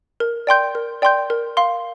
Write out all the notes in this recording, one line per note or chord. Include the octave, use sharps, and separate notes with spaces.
A#4
D5 G5 C6 G6
A#4
D5 G5 C6 G6
A#4
F5 C6